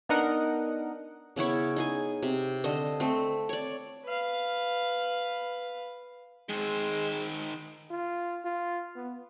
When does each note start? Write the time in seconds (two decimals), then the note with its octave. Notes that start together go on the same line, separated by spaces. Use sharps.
0.09 B3 D4 D#4 A#4 D#5 F#5
1.36 C#3 B3 E4 C#5
1.76 D#4 G#4 G#5
2.23 C3
2.64 D3 C5 D#5
3.00 A3 C4
3.49 C#5 D5
4.05 B4 F5
6.49 D#3 G#3 C5
7.91 F4
8.45 F4
8.96 B3